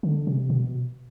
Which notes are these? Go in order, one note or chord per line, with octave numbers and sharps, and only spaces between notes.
D3
C3
B2